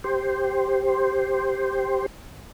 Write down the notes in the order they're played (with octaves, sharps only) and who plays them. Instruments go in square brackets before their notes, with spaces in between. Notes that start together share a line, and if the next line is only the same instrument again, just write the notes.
[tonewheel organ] G4 C5